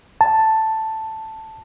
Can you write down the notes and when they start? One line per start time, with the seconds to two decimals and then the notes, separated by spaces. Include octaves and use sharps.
0.21 A5